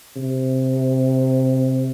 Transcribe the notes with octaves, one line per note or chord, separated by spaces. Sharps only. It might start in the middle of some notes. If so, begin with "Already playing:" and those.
C3